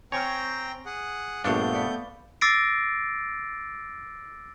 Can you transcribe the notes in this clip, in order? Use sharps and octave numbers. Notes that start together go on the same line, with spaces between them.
C4 C#5 G5 G#5 A#5 C#6 F6
G#4 F#5
A#1 G2 A3 B3 D4 F5 C#6 G6
B4 D5 C#7
D6 E6 A6 A#6 C7 D7